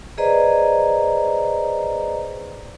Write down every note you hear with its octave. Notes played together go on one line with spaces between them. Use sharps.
G#4 B4 C5 D5 D#5 A#5